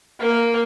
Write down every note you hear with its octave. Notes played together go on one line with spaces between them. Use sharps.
A#3